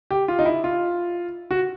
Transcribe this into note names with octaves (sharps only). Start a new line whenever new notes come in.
G4
F4
D#4
E4
F4
F#4